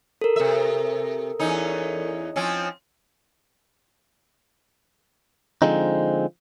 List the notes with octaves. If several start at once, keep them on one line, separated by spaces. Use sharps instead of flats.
A4 A#4
C3 E5
E2 C#4 D#4
F3 C4 C#4
D3 F3 G#3 C4 D#4